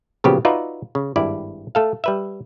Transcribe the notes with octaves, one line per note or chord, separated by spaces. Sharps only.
A#2 C#3 F3 F#3 B3 G4
D#4 F4 F#4 B4 D5 E5
C#3
G#1 G2 E4 D5
A3 A4 F5
G3 B4 E5